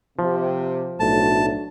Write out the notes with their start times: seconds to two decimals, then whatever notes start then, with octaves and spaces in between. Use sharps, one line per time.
0.19 C3 F3
1.00 B1 A2 F#3 A3 D4 A5